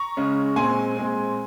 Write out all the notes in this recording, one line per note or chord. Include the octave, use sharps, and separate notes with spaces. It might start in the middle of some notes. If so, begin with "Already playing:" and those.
Already playing: A#5 C#6
C#3 G#3 C#4
A#2 G#3 C4 G#5 C6
A#2 G#3 C4